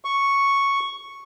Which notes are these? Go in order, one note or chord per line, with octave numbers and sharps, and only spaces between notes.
C#6